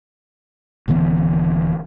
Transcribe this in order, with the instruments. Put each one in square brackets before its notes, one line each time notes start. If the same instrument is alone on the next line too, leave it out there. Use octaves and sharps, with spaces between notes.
[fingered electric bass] D#1 D3 E3 B3